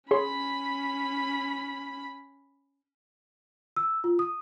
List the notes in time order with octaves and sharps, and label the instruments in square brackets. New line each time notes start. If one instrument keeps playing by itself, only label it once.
[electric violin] C#4 B5 [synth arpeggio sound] G#4 C#5 C6
[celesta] E6
F4
D#6